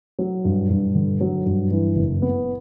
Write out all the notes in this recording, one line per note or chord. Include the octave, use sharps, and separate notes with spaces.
F#3
G2
G2
D3
F#3
G2
E3
F#1
B3